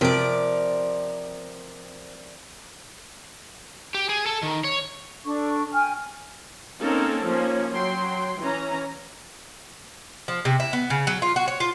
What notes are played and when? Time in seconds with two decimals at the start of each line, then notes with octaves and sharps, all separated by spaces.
0.01 C3 F3 A#4 D5
3.94 G4
4.09 G#4
4.26 A4
4.43 D#3
4.64 C#5
5.24 D4 A4 C#6
5.73 G5 G#5 F6
6.79 A#3 C4 C#4 D#4 A4 A#4
7.25 F3 A#3 C#4
7.73 F#3 G5 C6
8.39 E3 C#4 A#5
10.28 F3
10.45 C3
10.60 E4
10.73 B3
10.90 C#3
11.07 F#3
11.22 F4
11.36 F#4
11.48 C#5
11.60 F4